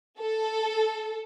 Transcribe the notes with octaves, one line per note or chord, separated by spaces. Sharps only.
A4